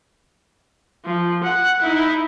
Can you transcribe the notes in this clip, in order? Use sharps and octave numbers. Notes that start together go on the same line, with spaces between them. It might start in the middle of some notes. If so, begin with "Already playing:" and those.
F3
F#5
D#4 E4